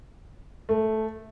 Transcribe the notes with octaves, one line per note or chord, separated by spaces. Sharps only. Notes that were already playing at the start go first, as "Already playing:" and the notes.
A3